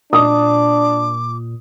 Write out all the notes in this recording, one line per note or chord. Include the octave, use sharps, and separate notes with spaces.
A#2 D4 D6 D#6